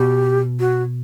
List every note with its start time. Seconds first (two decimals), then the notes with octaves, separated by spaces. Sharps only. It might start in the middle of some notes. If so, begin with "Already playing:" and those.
Already playing: B2 G4
0.60 F#4